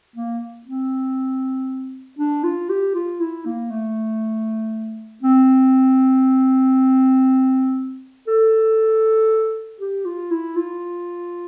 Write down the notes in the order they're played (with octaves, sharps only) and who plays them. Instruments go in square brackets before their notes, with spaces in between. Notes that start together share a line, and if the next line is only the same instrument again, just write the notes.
[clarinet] A#3
C4
D4
F4
G4
F4
E4
A#3
A3
C4
A4
G4
F4
E4
F4